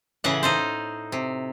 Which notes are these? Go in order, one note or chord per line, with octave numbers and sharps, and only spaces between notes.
A2 C#3 E3 C#5 F#5
D#4 A4 C5
C3